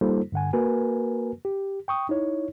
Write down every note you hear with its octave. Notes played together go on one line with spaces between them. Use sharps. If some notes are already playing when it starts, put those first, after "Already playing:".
G3 A#3 D#4 F4 A4 C5
G2 D3 F#5 G#5
A#3 F#4 A#4 B4 G#5
G4
G5 C#6 D#6
D#4 E4 C#5